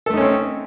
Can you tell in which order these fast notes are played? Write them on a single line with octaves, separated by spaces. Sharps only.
A4 A3 D#4 C#4 C4